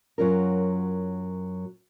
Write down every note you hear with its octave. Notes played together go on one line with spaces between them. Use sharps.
F#2 F#3 F4 A#4